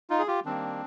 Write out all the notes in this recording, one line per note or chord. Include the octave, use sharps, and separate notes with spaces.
D#4 F4
G#4
F4 G4
D#3 G3 A#3 C4 D4